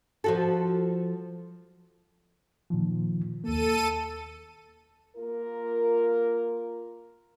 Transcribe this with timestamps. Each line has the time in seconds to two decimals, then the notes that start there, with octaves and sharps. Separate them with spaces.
0.24 F3 F#4 A4
2.70 A#2 D#3 F3
3.44 D#2 A#3 A4 D#7
5.17 A#3 F4 A#4